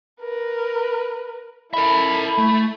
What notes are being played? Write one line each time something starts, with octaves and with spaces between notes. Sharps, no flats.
A#4 B4
E4 A4 A#4 E5 B5
A3